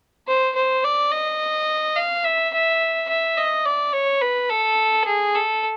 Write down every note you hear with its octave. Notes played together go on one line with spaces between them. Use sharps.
C5
C5
D5
D#5
F5
E5
E5
E5
D#5
D5
C#5
B4
A4
G#4
A4